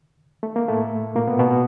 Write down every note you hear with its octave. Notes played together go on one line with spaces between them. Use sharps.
A3
A#3
A2 A3
A#2 A#3
B2 B3
B2 B3